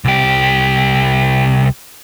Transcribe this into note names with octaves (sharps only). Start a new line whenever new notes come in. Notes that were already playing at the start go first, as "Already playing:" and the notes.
C2 G4